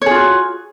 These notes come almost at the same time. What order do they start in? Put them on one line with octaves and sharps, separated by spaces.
C#5 G#4 F4 F#4